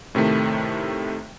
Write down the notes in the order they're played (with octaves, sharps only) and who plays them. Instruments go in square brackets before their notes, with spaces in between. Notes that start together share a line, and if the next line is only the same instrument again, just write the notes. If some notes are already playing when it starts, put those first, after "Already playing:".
[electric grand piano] A2 C3 D#3 A3